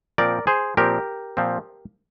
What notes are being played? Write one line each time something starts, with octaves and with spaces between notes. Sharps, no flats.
A#2 F3 C4 A#4 D5
G#4 C5
A#2 F3 C4 G4 A#4
A#2 F3 C4